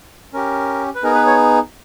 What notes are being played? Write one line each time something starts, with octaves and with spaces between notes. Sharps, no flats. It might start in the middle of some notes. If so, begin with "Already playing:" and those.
C#4 G4 A#4
B4
B3 D#4 G#4 A#4
B4
C#5